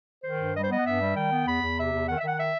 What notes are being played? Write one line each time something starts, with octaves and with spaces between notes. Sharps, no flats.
D#3 C5
G2
G3 D#5
C5
B3 D#5
F#5
G2 E5
G3
D#3 G5
B3
E2 B5
E2
C3 E5
E2
D#3 F#5
E5
D#3 F#5
E5